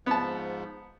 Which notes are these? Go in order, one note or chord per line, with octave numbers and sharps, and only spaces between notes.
G#2 F3 B3 A5